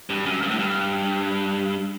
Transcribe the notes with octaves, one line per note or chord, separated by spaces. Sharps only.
G2
F#2
G2
A2
G2